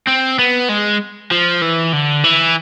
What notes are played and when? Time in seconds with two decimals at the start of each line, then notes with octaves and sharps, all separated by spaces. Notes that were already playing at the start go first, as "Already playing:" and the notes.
0.07 C4
0.39 B3
0.69 G#3
1.31 F3
1.62 E3
1.93 D3
2.24 E3